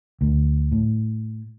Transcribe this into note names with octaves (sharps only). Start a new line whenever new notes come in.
D2
A2